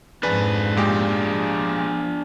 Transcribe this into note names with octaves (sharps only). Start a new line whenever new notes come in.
F2 G#2 D4 G#4 B4
A#2 G#3 G4
F3